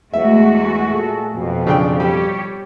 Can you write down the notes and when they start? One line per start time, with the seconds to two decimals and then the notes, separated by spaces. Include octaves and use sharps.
0.13 E2 G#3 A3 F#4 E5
0.89 A#2 G#4 A4
1.35 F2 B2
1.67 C#3 D4 G5
2.00 G3 G4 C#5